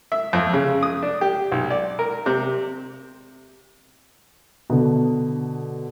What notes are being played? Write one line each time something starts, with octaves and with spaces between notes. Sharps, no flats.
E5
F2
C#3
D#6
D4
G4
B1
D5
A#4
C3
B2 D3